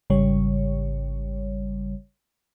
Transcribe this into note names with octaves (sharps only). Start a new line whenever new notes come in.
G#1 C#3 G3 C#5